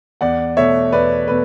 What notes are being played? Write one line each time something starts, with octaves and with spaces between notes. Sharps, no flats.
E2 D5 F#5
B2 A3 C#5 E5
E2 B4 D5
B2 A3 B4